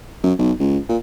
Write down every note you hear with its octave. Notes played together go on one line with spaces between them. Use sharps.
F#2
B1
C#2
A#2